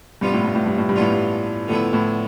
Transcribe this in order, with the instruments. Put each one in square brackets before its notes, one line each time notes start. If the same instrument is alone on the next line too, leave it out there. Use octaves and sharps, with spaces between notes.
[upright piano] G2 [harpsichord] C3 G3 B3 F4
[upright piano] A2
G2
A2
G2
A2
G2
[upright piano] A2 [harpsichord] E3 B3 D4 F4
[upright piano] G2
[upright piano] A2 [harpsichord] D3 F3 B3 E4
[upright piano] A2